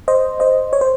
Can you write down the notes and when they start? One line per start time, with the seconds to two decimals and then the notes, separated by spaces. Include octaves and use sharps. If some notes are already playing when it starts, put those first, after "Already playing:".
0.08 C5 D#5
0.40 C5 D#5
0.73 C#5
0.81 C5